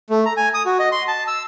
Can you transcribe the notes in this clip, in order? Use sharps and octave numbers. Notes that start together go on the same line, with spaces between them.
A3
A#5
G#5
D#6
F#4
D#5
C6
A5
E6